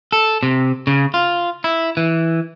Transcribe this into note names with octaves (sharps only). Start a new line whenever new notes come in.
A4
C3
C#3
F4
E4
E3